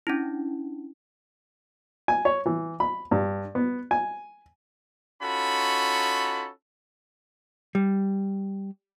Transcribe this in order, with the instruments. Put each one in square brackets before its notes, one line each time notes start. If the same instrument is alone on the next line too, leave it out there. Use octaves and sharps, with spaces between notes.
[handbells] C#4 D4 E4
[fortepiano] G#5
C#5
E3
B5
G2
B3
G#5
[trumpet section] C#4 D#4 F4 F#4 A4 B5
[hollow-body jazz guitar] G3